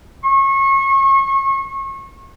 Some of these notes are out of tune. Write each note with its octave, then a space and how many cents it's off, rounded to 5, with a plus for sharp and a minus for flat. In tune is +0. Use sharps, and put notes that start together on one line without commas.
C#6 -30